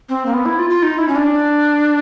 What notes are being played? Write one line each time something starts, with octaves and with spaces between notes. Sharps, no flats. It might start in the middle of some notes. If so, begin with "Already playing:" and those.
C4
A#3
B3
E4
F4
F4
D#4
E4
C#4
D4